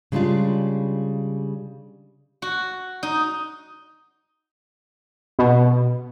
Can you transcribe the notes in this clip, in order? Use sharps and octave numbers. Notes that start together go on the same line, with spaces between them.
C#3 G3 G#3 D4 F4
F#4
D#4
B2